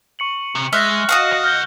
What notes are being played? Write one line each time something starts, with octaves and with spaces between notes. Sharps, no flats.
C#6 C#7 F#7
C3
G#3 E5 F6 F#6 A#6
F#4 D#5 F5 F#5
C2 F#5
F6 G6 G7